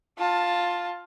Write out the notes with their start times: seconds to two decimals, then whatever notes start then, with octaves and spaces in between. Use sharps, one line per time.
0.18 F4 A5